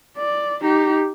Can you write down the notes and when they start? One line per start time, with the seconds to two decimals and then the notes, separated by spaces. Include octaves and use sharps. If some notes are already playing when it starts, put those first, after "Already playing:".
0.17 D5
0.62 D#4 G4